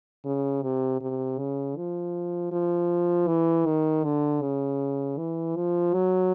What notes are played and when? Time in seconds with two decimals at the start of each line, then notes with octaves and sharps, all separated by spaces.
0.25 C#3
0.63 C3
1.01 C3
1.39 C#3
1.77 F3
2.52 F3
3.27 E3
3.66 D#3
4.04 D3
4.42 C#3
5.18 E3
5.56 F3
5.94 F#3